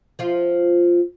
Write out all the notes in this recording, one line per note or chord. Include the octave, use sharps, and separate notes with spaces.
F3 F4